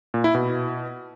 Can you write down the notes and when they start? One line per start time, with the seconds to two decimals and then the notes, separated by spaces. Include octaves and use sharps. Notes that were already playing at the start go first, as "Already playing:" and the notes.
0.14 A#2
0.24 E4
0.35 B2